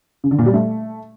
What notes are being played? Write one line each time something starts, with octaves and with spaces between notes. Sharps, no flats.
C#3
D3
A#2
G3
A3